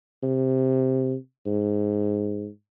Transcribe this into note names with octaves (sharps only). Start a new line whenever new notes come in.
C3
G#2